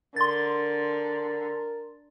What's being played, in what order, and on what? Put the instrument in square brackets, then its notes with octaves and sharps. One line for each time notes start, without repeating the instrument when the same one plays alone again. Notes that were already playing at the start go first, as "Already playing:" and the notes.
[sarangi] D3 [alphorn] A#4 [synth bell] C6 A6